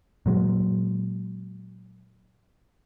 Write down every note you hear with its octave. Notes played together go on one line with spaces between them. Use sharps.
A#2 F#3 G#3